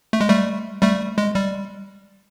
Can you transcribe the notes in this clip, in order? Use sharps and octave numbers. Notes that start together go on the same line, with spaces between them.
A3
G#3
G3 A3
G3 A3
G#3
G3